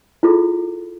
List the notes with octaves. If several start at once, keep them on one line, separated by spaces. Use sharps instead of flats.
E4 F4 G#4 A4